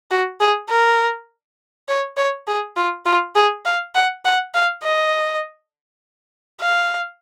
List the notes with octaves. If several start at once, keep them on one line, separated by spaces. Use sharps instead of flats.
F#4
G#4
A#4
C#5
C#5
G#4
F4
F4
G#4
F5
F#5
F#5
F5
D#5
F5